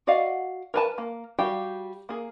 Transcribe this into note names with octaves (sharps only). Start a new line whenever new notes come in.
F#4 D5 D#5 F5 F#5
A#4 B4 A5
A#3
G3 F#4 G4 F5 G5
A#3 G#4